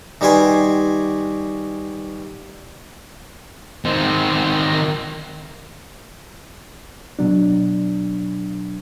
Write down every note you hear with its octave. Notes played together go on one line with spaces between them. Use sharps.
D#3 G3 F#4 B4 G#5 C6
D#3 C4
B2 F#3 D4